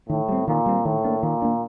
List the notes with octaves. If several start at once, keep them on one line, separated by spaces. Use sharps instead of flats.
A2 D#3
G3 C4
A#2 D#3
G3 C4
A2 D#3
A#3 D4
A#2 D#3
A#3 D4